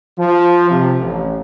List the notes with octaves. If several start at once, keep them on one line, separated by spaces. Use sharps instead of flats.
F3
C3
A1